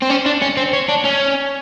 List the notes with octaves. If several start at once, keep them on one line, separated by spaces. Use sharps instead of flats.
C4
C#4
D4
C#4
C4
C#4
D4
C#4